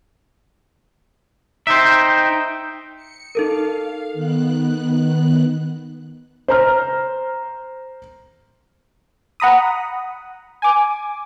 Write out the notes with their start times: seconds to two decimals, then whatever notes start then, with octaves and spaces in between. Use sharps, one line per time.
1.67 D#4 C5 E5 G5
2.96 C#7
3.35 D#4 A4 A#4 F5
4.13 D#3 B3 F#6
6.48 C5 A#5 F6
9.40 F#5 A#5 B5 D#6
10.62 G#5 D6